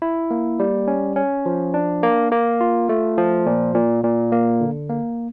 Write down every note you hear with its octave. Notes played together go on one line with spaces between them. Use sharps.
E4
A#3
G3
C#4
C#4
F3
D4
A#3
A#3
F4
A3
F3
A#2
A#2
A#2
A#3
D3
A#3